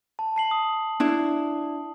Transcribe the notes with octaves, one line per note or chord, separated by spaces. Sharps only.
A5
A5 C7 F#7
D#6
D4 E4